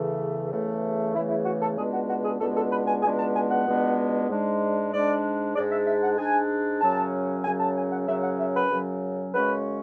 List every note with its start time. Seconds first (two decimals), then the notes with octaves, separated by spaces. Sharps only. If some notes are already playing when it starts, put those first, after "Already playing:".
Already playing: E2 C#3 E3 A3
0.51 E2 C#3 E3 A3
1.13 E2 C#3 E3 A3 E4
1.29 E4
1.45 F#4
1.61 A4
1.77 C#2 B2 G#3 B3 D4 G#4
1.93 F#4
2.09 F#4
2.24 G#4
2.40 C#2 B2 G#3 B3 D4 A4
2.56 A4
2.71 B4
2.87 G#5
3.02 C#2 B2 G#3 B3 D4 G#5
3.19 A5
3.35 G#5
3.50 F#5
3.66 C#2 B2 G#3 B3 D4
4.29 G#2 G#3 D4
4.92 G#2 G#3 D4 D5
5.55 G#2 G#3 D4 D5
5.71 E5
5.87 E5
6.02 F#5
6.18 G#2 G#3 D4 G#5
6.81 F#2 C#3 F#3 C#4 A5
7.44 F#2 C#3 F#3 C#4 G#5
7.60 A5
7.76 G#5
7.91 F#5
8.07 F#2 C#3 F#3 C#4 E5
8.23 F#5
8.39 E5
8.54 B4
8.70 F#2 C#3 F#3 C#4
9.33 F#2 C#3 G#3 C#4 B4